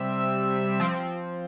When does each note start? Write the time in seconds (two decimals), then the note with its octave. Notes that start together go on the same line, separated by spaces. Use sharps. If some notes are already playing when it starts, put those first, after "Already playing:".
Already playing: C3 G3 C4 E5
0.80 F3 C4